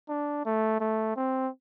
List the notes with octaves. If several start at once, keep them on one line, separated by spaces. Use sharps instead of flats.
D4
A3
A3
C4